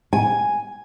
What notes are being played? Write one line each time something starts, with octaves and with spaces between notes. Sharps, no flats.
G#5